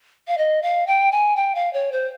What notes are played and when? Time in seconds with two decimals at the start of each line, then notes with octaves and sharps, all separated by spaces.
0.27 F5
0.37 D#5
0.62 F5
0.87 G5
1.11 G#5
1.36 G5
1.55 F5
1.73 C#5
1.92 C5